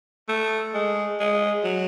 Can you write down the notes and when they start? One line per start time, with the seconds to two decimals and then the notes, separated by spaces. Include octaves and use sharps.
0.29 A3
0.74 G#3
1.20 G#3
1.64 F#3